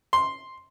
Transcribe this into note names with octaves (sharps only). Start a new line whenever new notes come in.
C6